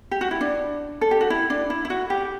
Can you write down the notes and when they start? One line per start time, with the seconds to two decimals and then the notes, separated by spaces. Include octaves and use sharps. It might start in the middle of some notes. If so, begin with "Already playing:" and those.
0.11 G4
0.21 F#4
0.31 E4
0.41 D4
1.01 A4
1.11 G4
1.21 F#4
1.30 E4
1.50 D4
1.70 E4
1.85 E4
1.90 F#4
2.10 G4